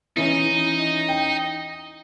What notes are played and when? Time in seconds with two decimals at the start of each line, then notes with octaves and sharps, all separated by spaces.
0.17 E3 C#4 D#4
1.09 G5